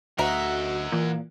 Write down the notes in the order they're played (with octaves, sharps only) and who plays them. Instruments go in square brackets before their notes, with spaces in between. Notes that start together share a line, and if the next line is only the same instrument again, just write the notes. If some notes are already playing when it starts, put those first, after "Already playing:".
[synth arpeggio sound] D2 [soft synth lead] F#4 [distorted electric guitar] A#4 F#5 [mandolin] D#5 E5 A#5
[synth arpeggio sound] A#2 [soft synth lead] E3